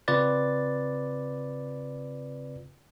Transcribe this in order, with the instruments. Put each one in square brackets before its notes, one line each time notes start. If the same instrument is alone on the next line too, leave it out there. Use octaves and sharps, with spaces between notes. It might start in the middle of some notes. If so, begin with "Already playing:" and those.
[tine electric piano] C#3 C4 F4 B4 D5 A6